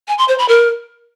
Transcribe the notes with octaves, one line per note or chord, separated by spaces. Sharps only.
G#5
C6
C5
B5
A#4